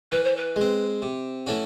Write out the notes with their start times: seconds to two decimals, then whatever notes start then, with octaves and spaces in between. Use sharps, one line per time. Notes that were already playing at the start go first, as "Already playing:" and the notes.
0.11 E3 B4
0.24 C5
0.36 B4
0.56 G#3 C4
1.02 C3
1.47 E3 A3 C#4 F#4